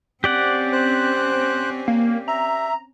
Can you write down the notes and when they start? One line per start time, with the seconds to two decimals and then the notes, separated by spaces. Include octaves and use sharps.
0.24 C4 C#4 G4 D5 F#5
0.73 C5 F#6
1.88 A#3
2.28 E5 A#5